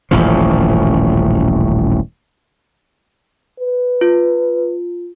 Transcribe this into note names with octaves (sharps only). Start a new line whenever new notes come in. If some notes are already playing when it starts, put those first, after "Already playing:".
D#1 A1 F#2 F3
B4
F4